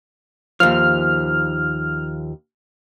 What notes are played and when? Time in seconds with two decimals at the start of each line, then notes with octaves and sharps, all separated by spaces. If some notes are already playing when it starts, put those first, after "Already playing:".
0.60 D#2 F3 F6